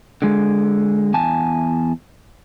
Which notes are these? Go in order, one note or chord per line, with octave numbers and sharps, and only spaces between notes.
D3 G#3
E2 G#5 A5